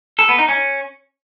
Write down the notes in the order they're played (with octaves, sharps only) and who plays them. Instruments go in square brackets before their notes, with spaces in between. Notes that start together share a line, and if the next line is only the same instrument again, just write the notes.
[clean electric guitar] A4
B3
D#4
C#4